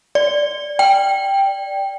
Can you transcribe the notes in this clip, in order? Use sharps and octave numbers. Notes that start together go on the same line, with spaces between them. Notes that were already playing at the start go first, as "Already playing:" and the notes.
D5
G5